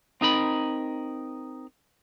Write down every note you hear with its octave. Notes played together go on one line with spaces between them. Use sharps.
C4 D#4 A#4 B5